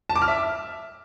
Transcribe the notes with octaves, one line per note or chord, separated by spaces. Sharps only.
A5
D6
F6
E5